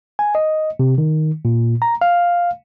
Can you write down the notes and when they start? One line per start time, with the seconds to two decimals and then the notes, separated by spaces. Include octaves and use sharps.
0.19 G#5
0.35 D#5
0.80 C3
0.98 D#3
1.45 A#2
1.82 A#5
2.01 F5